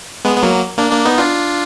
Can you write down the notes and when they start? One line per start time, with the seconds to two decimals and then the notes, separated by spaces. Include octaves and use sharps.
0.25 G#3 B3
0.37 B3
0.43 F#3 A#3
0.78 A#3 D4
0.91 A#3 D4
1.05 B3 D#4
1.18 D4 F4